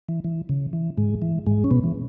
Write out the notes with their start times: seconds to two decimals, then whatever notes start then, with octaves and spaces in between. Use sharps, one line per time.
0.09 E3
0.24 E3
0.49 C#3
0.73 E3
0.97 G#2 G#3
1.22 E3
1.46 G#2 G#3
1.64 C#4
1.71 B2 B3
1.84 E3